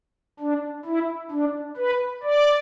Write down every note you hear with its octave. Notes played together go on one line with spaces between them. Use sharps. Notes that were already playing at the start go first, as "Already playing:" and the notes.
D4
E4
D4
B4
D5